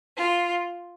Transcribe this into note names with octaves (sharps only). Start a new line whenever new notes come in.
F4